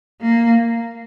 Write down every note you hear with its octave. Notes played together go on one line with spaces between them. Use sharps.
A#3